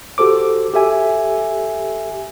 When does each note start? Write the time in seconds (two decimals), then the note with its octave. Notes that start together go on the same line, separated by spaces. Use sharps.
0.18 F#4 G4 A4 C5 D6
0.74 G4 A4 E5 G#5